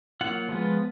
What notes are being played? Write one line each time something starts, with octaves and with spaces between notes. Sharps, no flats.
F#3 A#3 F4 F#5
F3 G#3 B3 F4